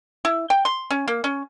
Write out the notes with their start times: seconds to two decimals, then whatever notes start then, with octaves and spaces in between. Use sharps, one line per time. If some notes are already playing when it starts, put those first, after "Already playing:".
0.25 E4
0.50 G5
0.65 C6
0.91 C#4
1.08 A#3
1.24 C#4